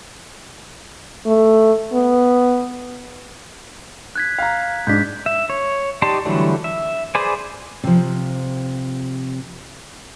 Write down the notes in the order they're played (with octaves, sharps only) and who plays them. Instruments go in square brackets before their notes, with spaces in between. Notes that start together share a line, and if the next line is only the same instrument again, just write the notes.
[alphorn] A3
B3
[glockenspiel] F#6 G#6 B6
[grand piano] F5 A#5
[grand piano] G#2 D4 [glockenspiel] G6 B6
[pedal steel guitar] E5
C#5
D#4 G4 D5 A5 C6
D3 E3 F#3 G3 A3
E5
G#4 B4 C5 D5 G#5
[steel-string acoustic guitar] C3 F3